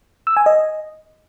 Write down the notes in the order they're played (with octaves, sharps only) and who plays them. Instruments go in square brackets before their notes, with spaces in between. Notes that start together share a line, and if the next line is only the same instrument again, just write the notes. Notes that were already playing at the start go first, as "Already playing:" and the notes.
[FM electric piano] E6
G#5
D#5